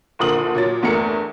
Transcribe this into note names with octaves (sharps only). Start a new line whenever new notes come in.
F#1 A#2 D3 A#4 D#6 F#7
A#2 F#3 A6
G1 E2 A3 A#4 C#7